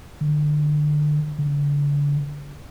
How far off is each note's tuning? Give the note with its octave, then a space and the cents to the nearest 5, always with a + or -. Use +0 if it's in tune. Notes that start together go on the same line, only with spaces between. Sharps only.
D3 +25
D3 -35